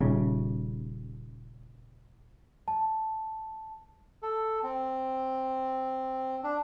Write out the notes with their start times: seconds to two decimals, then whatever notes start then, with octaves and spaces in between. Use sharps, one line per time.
0.01 D#1 C#3
2.68 A5
4.23 A4
4.63 C4
6.44 D4